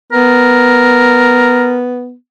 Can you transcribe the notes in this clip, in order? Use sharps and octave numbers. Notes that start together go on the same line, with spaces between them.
B3 A#4